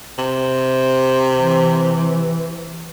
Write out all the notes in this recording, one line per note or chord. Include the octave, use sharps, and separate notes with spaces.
C3
E3